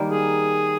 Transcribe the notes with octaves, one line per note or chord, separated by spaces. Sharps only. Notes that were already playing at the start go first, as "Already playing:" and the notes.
Already playing: D#3 G3 A#3
G#4